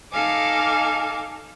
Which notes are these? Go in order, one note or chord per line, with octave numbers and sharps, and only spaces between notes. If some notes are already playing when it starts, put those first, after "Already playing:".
D#4 A4 F5 G#5 D6